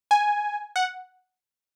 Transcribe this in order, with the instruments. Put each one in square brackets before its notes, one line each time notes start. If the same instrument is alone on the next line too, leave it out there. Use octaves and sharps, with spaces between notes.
[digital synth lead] G#5
F#5